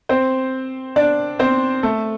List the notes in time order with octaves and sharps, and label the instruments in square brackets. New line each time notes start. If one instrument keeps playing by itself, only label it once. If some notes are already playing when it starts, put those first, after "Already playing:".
[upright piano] C4 C5
D4 D5
C4 C5
A3 A4